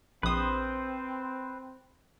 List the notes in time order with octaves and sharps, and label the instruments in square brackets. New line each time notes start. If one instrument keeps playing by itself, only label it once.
[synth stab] A#1 D#6 [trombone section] C4 [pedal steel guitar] B4 C5